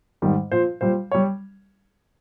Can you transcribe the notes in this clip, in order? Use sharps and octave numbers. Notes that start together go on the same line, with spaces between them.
G#2 D#3 G3
A#2 F3 C5
A#2 G3 C5
G3 C#5